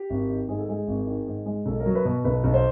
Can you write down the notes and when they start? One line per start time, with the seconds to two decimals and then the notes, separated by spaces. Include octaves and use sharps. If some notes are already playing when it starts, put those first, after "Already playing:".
Already playing: G4
0.10 G#1
0.29 D#3
0.48 G#2 G#4
0.58 A4
0.69 G#3 G#4
0.87 G#1
1.07 D#3
1.27 G#2
1.46 G#3
1.66 B1 A4
1.80 A#4
1.86 F#3
1.95 B4
2.05 B2
2.25 B1 B4
2.44 B1
2.54 C5